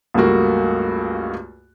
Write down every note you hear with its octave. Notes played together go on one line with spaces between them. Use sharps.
C#2 G2 A3 A#3 F#4